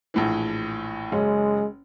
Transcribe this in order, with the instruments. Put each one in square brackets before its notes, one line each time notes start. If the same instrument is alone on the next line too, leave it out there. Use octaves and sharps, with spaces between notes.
[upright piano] A#1 A2 E3
[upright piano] F#1 C#4 [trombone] G#3